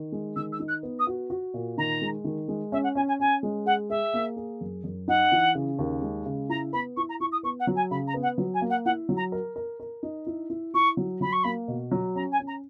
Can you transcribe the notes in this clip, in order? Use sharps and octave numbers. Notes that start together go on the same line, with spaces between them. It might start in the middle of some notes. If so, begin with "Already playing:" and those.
Already playing: D#3
G#3
D#3 E6
E6
D#4
F#6
B3
D#6
F#4
F#4
A#2
D#3 A#5
G#3
D#3
G#3
C#4 E5
F#5
C#4 G#5
G#5
C#4 G#5
G#3
G#4 F#5
G#4 E5
A#3
G#4
F#2
F#2
D#4 F#5
E3
C#3
D#2
G#3
C#3
E4 A#5
B3 B5
E4 C#6
A#5
E4 C#6
D#6
B3 C#6
F#5
F#3
G#5
C#3 B5
A#5
B3
F#5
F#3
G#5
A#3
F#5
E4 F#5
F#3
A#5
A#4
A#4
A#4
D#4
E4
E4
E4 C#6
F#3
F#3 B5
C#6
A#3 B5
B2
F#3
C#4 A#5
G#5
C#4
A#5